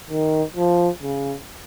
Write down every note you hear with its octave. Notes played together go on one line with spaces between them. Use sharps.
D#3
F3
C#3